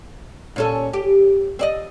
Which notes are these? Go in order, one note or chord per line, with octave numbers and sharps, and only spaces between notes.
A#2 C#4 A4
G4
C4 D5 D#5